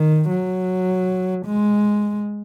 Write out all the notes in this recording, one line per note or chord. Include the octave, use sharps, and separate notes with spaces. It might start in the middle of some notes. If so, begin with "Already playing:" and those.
Already playing: D#3
F#3
G#3